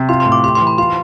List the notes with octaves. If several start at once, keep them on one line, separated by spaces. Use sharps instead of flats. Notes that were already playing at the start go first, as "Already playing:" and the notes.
Already playing: C3
F4 C6
C6
A2
D6
G4 C6
C6
E3
B5
F4 C6